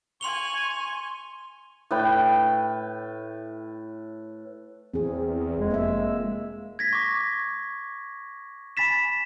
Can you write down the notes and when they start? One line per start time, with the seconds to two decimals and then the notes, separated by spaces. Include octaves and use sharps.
0.21 G#5 C6 C#6 F7 G7
1.91 A2 B4 G5
4.94 E2 C4 G#4
5.58 F1 G#3
5.71 A#3 E5
6.79 G#6 A#6 B6
6.93 C#6 D6 A#6
8.77 G#5 B5 A6 B6 E7